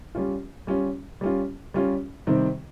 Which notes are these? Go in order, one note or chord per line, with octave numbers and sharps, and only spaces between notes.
G3 C#4 F4
G3 C#4 F4
G3 C#4 F4
G3 C#4 F4
C3 D#3 G3 C4